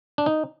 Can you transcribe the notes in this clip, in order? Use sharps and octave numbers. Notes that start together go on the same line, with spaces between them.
D4
D#4